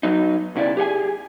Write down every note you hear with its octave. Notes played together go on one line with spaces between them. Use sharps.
F#3 D#4
B1 C#3 E4 D5
G4 G#4 F#5 G#5